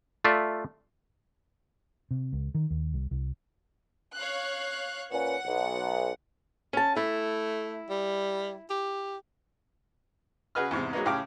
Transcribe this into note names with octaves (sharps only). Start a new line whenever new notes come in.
A3 F4 D5 E5
C3
C#2
D#3
D#2
C2
C2
C#5 F5 F#6
A#2 C#4 B4 F#5
B1
C#4 A5
A3 E4
G3
G4
C#3 F#4 G#4 B4 D#5 F6
E2 G#2 C3
F#3 G#3 A#3 B3 D#4
A2 C#3 G4 F5 D6 F6